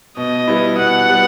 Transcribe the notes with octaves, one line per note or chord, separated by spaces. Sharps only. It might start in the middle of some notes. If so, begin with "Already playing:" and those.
B2 D#5
G3 B3 E4
B2 F#5
G3 B3